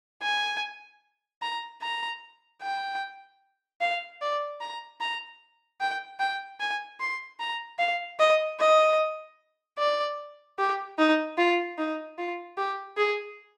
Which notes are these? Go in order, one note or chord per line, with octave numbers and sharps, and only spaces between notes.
G#5
A#5
A#5
G5
F5
D5
A#5
A#5
G5
G5
G#5
C6
A#5
F5
D#5
D#5
D5
G4
D#4
F4
D#4
F4
G4
G#4